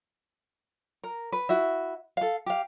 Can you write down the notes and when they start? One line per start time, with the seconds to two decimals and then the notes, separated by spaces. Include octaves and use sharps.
1.04 A#4
1.32 B4
1.49 E4 F#4 E5
2.17 A4 F5
2.46 G4 F5